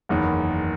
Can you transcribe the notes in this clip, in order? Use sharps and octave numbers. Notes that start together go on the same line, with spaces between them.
F#1 E2 D#3